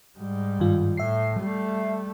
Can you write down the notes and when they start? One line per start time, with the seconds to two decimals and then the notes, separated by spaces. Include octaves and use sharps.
0.18 G#2 G3
0.60 G2 D#3 F4
0.97 A2 E5 C7
1.39 G3 A3